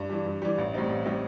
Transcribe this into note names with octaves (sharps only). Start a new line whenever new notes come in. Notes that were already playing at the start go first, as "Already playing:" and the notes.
Already playing: G2
E3 G3
G2
E3 G3
A1
A2 G3 C4 D#4
A1
A2 G3 C4 D#4